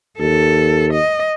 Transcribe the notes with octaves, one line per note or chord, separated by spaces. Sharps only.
D#2 A4
D#5